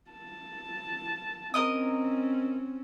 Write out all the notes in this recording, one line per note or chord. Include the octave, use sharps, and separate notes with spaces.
A5
C4 C#4 A#4 D#5 D#6